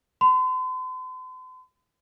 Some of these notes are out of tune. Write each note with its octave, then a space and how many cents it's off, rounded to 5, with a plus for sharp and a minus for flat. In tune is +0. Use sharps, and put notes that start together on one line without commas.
C6 -45